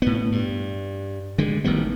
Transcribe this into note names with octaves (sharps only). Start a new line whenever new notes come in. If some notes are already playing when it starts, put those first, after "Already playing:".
A2 B3
G2
D3 G#3
A1 D#3 G3 B3